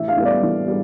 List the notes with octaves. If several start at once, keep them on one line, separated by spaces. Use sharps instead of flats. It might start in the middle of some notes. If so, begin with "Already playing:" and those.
Already playing: A1 E5
F5
A2 G3 B3
D5
A1
G3